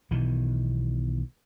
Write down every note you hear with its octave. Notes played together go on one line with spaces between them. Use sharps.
B1 B2 D#3 E3